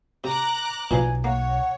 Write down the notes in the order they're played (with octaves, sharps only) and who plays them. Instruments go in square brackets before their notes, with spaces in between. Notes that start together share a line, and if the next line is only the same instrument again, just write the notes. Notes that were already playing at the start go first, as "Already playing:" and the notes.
[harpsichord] C3 [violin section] A#5 D6 F#6
[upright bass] B1 [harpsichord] A#2 E3 F3 [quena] G#5
[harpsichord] A#3 [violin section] C#5 [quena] F#5